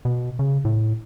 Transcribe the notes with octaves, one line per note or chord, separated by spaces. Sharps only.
B2
C#3
A2